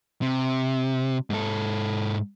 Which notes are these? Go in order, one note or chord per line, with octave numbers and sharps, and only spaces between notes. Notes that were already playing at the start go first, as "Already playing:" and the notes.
C3
G#2 A4